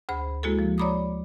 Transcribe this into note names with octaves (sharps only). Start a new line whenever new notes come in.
D2 G#4 C5 B5
G#3 A#3 E4 F#4 G#4 A4
F3
C#5 D5 A#5 B5 D6 D#6